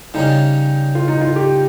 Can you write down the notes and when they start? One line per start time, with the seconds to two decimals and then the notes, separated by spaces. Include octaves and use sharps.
0.14 C#3 G3 C#4 D#4
0.95 F4
1.08 D#4
1.21 F4
1.36 G4